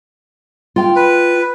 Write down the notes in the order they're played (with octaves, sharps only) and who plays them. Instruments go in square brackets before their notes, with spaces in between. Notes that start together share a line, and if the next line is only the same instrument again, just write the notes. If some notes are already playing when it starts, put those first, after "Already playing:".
[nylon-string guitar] F4 G5
[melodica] B4